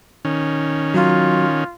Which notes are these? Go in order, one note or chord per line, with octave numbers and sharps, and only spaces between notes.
D#3 C#4
F#3 F4